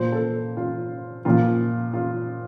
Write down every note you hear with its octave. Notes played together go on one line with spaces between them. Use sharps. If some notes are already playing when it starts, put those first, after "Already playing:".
Already playing: A#2 F3 C5
A4
F4
A#2 F3 F4
F4